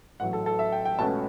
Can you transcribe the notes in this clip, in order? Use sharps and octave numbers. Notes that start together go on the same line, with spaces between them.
A1 A2 F#3 F#5
A4
A4
E5
G5
G5
C#2 B2 A3 C#4 A5